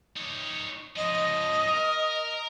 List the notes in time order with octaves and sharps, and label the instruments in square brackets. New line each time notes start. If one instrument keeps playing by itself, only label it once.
[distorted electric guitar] D#4 C#5
[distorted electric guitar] C#3 F3 [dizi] D#5
[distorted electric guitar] A#4